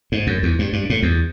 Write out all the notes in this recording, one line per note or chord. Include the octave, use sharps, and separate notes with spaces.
G#2
F#2
E2
G2
G2
A2
E2